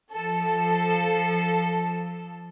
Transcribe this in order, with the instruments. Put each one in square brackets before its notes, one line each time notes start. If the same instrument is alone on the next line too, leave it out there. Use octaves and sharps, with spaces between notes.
[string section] F3 A4